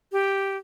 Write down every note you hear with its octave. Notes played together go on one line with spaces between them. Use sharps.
G4